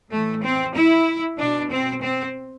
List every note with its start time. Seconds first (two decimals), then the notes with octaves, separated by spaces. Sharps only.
0.11 A2 E3 A3
0.43 C4
0.75 E4
1.38 B2 D4
1.71 C4
2.03 C4